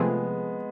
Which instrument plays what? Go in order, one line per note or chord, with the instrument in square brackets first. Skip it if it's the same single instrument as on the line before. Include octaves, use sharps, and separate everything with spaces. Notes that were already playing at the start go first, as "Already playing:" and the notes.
Already playing: [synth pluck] C3 F3 A3 C4 G#4 [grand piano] G#3 B3